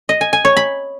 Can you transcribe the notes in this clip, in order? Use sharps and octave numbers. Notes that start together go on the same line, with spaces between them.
D#5
G#5
G#5
C#5
B5